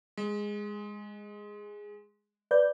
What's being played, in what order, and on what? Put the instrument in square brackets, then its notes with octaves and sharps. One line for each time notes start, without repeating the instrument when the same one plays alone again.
[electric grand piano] G#3
[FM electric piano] B4 D5 G6